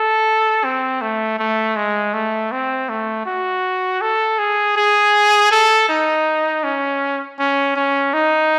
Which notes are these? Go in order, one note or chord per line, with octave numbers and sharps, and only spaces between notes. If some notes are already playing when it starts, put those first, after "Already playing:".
Already playing: A4
C4
A3
A3
G#3
A3
C4
A3
F#4
A4
G#4
G#4
A4
D#4
C#4
C#4
C#4
D#4